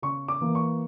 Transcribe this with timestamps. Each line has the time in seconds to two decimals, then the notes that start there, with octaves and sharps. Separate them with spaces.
0.02 C#3 C#6
0.28 D6
0.41 E3 A#3
0.55 C#6